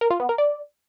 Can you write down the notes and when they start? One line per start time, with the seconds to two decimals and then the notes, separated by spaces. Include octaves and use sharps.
0.01 A#4
0.10 F4
0.20 B3
0.29 A#4
0.38 D5